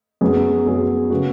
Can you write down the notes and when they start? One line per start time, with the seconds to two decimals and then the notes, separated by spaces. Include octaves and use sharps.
0.21 F#2 F#3 B3 G#4
0.66 F#2 F#3 B3 G#4
1.10 C#3 B3 F#4